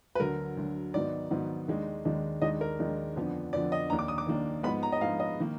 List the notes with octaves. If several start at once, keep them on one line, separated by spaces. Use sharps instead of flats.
B4
D2 D3 F#3 A#4
D2 D3 F#3
G#2 D#3 F#3 B3 D5
G#2 D#3 F#3 B3
D#2 D#3 G#3 D4
D#2 D#3 G#3 D4
D#2 D#3 G#3 D4 D#5
A#4
D#2 D#3 G#3 D4
F2 D3 F3 B3 D4
F2 D3 F3 B3 D4 D5
D#5
D#2 D#3 A#3 D4 A#5
D6
D#6
D6
D#2 D#3 A#3 D4
G#2 F3 G#3 B3 B5
A#5
D#5
G#2 F3 G#3 B3 F5
D#5
D#3 A#3